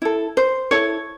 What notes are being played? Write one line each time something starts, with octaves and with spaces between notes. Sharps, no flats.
E4 A4
C5
E4 A4 C#5